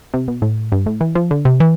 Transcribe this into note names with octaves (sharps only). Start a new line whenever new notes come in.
C3
B2
A2
G2
A2
E3
F3
D3
C3
E3